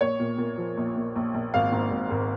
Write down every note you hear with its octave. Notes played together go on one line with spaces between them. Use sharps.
A#1 C#5
A#2
A#2
F3
A#1
A#2
A#1
A#1
G#1 F5
G#2
G#1
G#1